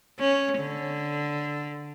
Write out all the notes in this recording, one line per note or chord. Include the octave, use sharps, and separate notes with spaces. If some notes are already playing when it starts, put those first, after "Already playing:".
C#4
D3